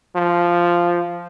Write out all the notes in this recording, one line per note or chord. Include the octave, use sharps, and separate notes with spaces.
F3